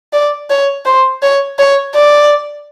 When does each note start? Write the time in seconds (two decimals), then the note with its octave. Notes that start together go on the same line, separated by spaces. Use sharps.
0.13 D5
0.50 C#5
0.85 C5
1.23 C#5
1.59 C#5
1.95 D5